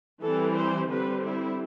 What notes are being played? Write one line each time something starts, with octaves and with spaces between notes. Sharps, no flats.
E3 G3 C4 A4
C5
D3 G3 C4 B4
E4